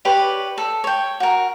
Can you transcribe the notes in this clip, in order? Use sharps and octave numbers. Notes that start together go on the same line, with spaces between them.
G4 B4 C#5 D5
A4
C#5 G5
F#4 A#4